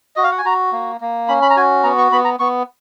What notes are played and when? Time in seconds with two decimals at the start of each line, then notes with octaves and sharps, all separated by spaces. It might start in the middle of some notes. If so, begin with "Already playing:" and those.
0.16 F#4 D#5
0.23 F5
0.31 F#5
0.38 G#5
0.45 F#4 A#5
0.72 A#3
1.01 A#3
1.28 C#4 B5
1.42 B5
1.50 A#5
1.56 F#4 G#5
1.83 B3 A#5
1.98 C#6
2.12 B3 B5
2.25 A#5
2.40 B3 C#6